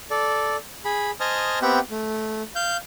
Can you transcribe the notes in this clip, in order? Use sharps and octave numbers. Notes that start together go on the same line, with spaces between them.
A4 D5
G#4 B5
C5 D#5 G#5 A5 D#6 F6
B3 C4 G4 E5 F#5 G5
A3
F5 G6